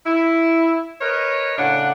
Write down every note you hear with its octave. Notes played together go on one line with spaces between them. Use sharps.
E4
A#4 B4 C#5 D#5
A2 C#3 D4 F#5